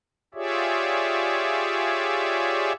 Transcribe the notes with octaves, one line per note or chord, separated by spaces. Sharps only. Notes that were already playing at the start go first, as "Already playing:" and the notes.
F4 G4 G#4 C#5 D5 E5